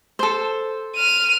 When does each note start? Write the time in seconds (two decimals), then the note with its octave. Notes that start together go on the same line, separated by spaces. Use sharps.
0.19 A4 C5
0.96 F6 D#7